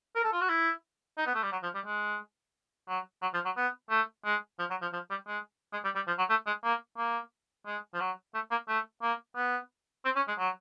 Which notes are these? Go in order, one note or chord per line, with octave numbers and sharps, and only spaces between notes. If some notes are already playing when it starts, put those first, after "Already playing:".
A#4
A4
F4
F#4
E4
D#4
B3
A3
G3
F#3
F3
G3
G#3
F#3
F#3
F3
F#3
B3
A3
G#3
F3
F#3
F3
F3
G3
G#3
G#3
G3
G3
F3
F#3
A3
G#3
A#3
A#3
G#3
F3
F#3
A3
A#3
A3
A#3
B3
C4
C#4
G#3
F#3